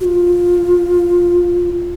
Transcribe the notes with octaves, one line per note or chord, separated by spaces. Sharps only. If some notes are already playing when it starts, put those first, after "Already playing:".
F#4
F4